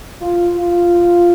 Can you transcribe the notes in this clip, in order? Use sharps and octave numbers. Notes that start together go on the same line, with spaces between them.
F4
F4